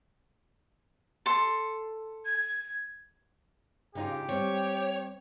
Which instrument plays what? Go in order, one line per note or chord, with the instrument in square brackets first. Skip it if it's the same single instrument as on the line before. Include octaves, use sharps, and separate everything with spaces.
[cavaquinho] A4 C6
[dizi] G#6
[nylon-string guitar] C#3 D#4 F4 [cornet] G4
[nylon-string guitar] G3 C4 [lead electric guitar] C#5